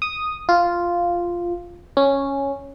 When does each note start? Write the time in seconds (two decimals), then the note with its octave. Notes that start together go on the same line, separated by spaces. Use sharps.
0.02 D#6
0.49 F4
1.97 C#4